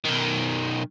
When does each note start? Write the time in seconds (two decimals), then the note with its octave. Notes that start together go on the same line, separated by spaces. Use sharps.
0.05 B1 D#3